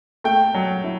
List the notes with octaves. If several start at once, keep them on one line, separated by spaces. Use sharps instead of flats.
A3 G5
F#3
E4